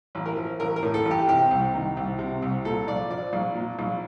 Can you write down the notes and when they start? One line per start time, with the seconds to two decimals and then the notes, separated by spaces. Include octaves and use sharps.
0.15 A1
0.26 A#4
0.37 F3
0.60 A1 A#4
0.76 A#4
0.82 A2
0.94 A4
1.05 A1
1.11 G4
1.27 C3 G4
1.51 C2
1.74 D#3
1.97 C2
2.19 C3
2.42 C2
2.65 A#2 A4
2.87 A#1 D5
3.10 F3 D5
3.33 A#1
3.55 A#2
3.79 A#1